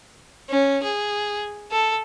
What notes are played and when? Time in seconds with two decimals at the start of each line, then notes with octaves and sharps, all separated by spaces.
0.49 C#4
0.83 G#4
1.71 A4